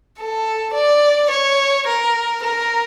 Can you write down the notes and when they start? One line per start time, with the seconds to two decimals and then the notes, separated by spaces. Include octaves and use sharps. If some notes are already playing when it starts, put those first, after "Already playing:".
0.19 A4
0.74 D5
1.31 C#5
1.87 A#4
2.43 A#4